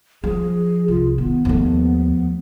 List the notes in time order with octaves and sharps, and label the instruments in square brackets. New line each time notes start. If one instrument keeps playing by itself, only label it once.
[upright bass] F3 [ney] G#4
[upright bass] C2 [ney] F4
[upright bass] D#3 [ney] B3
[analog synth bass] D#2 [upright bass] F3 A3